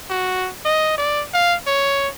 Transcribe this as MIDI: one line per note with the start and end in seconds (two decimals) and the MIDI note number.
0.10 0.50 66
0.66 0.98 75
0.98 1.23 74
1.34 1.55 77
1.67 2.08 73